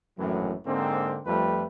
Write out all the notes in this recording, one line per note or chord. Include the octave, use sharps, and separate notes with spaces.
G#1 F#2 A2 E3 F#3
G#2 D3 A#3 C4
F2 F3 G3 A3 B4